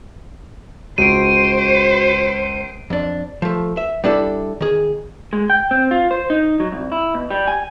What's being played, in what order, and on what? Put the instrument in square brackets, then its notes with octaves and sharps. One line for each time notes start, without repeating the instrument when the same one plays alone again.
[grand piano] C#2 [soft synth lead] F#4 [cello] C5 [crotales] D7 D#7
[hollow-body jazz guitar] F2 D4
F3 A3
E5
G3 D4 E4 A4
D#3 G#4
[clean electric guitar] G#3
G5
C4
F4
C5
D#4
F#3
C2
E4
B2
G3
G#5